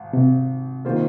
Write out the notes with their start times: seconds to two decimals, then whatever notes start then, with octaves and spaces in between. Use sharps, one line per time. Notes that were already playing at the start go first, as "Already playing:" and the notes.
Already playing: G#1
0.13 C3
0.85 D#3 A#3 F4 C5